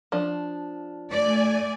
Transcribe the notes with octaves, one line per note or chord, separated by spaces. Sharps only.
F3 D4
A3 D5 G#5